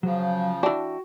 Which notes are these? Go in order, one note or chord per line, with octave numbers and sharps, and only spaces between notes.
C#3 F3 F#3
E3 D4 F#4 G5